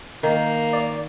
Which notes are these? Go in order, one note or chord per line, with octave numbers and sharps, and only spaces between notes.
D#3 A#3
D5